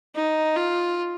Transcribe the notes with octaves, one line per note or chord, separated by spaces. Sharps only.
D#4
F4